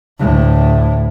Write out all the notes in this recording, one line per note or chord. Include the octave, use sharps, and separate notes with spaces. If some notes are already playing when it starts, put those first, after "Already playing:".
D2 A2